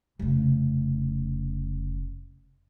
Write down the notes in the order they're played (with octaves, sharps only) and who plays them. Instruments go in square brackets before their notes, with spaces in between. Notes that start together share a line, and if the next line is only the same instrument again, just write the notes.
[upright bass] F1 C#3